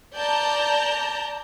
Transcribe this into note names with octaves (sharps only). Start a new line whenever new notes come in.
D5 A5 A#5 G6